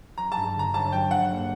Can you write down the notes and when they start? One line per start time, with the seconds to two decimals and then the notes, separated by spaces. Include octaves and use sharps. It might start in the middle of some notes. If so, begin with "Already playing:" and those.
0.18 F#3 A#5
0.32 A5
0.37 G2
0.55 D3 A#5
0.74 G1 A5
0.93 F#3 G5
1.11 G2 F#5
1.30 A#3